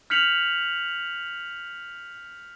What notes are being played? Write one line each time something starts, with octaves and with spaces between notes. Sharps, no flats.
F6 G6 B6 C#7 F7 F#7